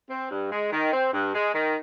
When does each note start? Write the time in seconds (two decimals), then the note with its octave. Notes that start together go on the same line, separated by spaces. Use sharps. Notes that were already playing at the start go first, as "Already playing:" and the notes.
0.09 C4
0.31 G2
0.52 G#3
0.72 D#3
0.93 C4
1.13 G2
1.35 G#3
1.54 D#3